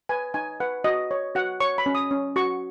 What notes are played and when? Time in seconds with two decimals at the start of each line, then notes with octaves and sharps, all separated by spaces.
0.09 B4 G#5
0.34 D#4 G#5
0.60 B4 F#5
0.84 F#4 D#5
1.11 C#5
1.35 F#4 F#5
1.60 C#5 C#6
1.78 B5
1.86 C#4
1.95 D#6
2.11 C#4
2.36 F#4 C#6